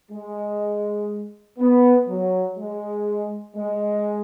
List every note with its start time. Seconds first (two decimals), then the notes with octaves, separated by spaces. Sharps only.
0.12 G#3
1.59 B3
2.08 F#3
2.58 G#3
3.56 G#3